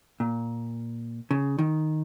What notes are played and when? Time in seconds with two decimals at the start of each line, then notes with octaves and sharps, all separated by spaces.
0.20 A#2
1.31 C#3
1.59 D#3